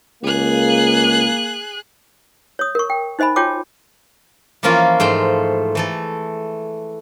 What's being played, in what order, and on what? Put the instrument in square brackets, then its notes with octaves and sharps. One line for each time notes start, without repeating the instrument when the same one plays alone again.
[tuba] C#2 [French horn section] A#3 [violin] G#4 F#6
[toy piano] C#5 D#6
A#4 C#6
G5
D#4 C5 D#5 G#5 B5
F4 F#4 C#5 G5 A5 D6
[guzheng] E3 F3 A#3 C#4 F4 A#4
G#2 A3 C5 G5
E3 A3 A4